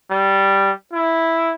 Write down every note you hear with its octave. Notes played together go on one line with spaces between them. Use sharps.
G3
E4